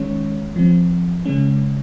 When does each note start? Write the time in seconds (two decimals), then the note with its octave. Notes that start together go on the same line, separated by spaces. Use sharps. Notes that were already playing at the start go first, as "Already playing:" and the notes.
Already playing: D#3 G#3 C#4 C#5
0.56 F3 C4
1.25 C#3 G#3 C#4